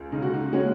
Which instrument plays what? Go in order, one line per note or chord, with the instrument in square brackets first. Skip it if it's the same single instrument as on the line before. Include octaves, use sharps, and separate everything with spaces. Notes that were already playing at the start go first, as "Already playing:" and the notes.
Already playing: [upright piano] C#2
C#3 D#4
F#4
D#4
G#3 C#4 F#4